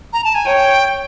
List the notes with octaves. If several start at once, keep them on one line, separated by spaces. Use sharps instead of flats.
A#5
A5
G#5
C#5 G5